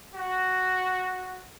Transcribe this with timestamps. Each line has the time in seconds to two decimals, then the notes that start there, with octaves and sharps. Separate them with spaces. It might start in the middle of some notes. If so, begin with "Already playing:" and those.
0.15 F#4